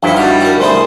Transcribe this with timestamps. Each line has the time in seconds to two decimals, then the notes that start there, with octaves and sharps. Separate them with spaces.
0.03 G2 D#3 F3 E4 A4
0.16 G3 F#4 F5
0.41 F#4 A#4
0.60 C2 A3 E4 G#4 C5